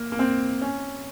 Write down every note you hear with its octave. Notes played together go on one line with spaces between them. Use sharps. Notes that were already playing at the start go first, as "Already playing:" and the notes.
Already playing: A#3
A#3
C4
C#4